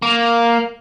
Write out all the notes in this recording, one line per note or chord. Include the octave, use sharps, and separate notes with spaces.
A#3